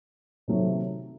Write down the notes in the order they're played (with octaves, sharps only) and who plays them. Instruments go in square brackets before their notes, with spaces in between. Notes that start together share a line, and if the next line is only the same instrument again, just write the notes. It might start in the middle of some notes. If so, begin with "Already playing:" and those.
[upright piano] C3 D#3 F#3 A3